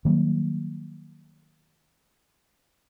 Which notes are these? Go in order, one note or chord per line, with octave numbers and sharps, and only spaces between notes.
D#3 F#3 G3 A#3